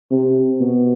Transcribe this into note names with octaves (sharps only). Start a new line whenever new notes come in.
C3
B2